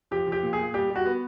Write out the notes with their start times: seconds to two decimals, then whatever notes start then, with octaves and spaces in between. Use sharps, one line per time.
0.11 F3 G4
0.27 F3
0.32 G4
0.43 A#2
0.53 G#4
0.58 A#2
0.74 G3 G4
0.90 G3
0.95 F#4
1.06 B3